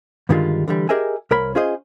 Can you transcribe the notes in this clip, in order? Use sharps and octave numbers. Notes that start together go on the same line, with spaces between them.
G2 D3 D#3 G3 G#3 F4
D3 E3 G3
G4 G#4 A#4 D#5 E5 G#5
C2 A#4 C#5 B5 C6
C#4 F4 G#4 C5 D#5